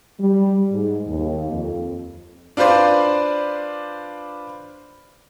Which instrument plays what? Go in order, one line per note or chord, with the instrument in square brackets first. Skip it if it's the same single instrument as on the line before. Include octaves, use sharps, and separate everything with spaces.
[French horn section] G3
G#2
D#2
F2
[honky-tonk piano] D4 F4 B4 C5 D5